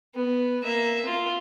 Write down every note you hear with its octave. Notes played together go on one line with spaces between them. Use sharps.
B3
A#3 E5
F4